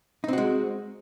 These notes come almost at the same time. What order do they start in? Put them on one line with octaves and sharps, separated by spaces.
D#4 C4 F#4 G#3